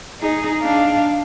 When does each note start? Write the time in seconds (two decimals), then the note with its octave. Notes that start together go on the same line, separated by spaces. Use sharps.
0.21 D#4 G#4
0.61 D4 F5